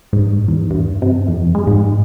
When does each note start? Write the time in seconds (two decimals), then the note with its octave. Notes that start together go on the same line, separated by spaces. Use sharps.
0.13 G#2
0.48 E2
0.70 G2
1.02 C3
1.28 F2
1.55 G#3
1.67 G#2